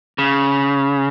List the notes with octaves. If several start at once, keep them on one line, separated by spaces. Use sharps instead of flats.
C#3